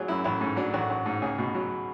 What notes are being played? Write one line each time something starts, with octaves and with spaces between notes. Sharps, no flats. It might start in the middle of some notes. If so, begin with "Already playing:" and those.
Already playing: G#1 F#3 G#4
F#2 E4
A1 E4
G#2 C#4
F#3 D4
A1 F#4
A1
G#2
C#2 G#4
B2
F#3